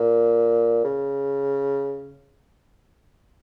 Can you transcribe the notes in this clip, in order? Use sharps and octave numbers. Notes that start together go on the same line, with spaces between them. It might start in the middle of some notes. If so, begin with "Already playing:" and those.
Already playing: A#2
C#3